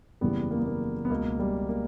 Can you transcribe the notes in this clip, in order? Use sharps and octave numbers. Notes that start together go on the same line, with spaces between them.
F#1 E2 C#3 E3 G3 B3
A#3
B3
A#3
B3
C#2 B2 A#3
G3
A#3